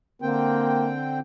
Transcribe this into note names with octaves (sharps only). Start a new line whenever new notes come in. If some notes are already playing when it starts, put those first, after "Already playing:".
D3 A#3 C4 G5